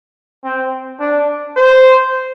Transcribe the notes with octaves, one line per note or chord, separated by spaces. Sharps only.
C4
D4
C5